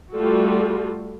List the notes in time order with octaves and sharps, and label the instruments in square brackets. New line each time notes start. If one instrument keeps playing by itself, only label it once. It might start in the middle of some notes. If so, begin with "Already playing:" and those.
[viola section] G3 A3 F4 F#4 A4